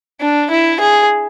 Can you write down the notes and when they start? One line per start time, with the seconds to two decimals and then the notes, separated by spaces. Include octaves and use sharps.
0.21 D4
0.51 E4
0.80 G#4